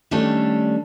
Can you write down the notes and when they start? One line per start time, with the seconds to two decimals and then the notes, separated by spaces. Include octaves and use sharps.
0.11 D#3 G3 A3 C#4 D4 A4